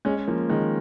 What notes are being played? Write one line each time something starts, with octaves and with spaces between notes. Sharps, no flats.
G#3 C#4
F3 A#3
D#3 G#3